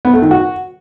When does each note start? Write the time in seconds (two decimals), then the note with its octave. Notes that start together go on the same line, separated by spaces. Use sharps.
0.05 B3
0.13 A3
0.22 D#3
0.31 F#4